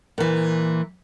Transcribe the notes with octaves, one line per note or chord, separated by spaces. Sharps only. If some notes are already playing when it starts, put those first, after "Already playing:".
A#2 E3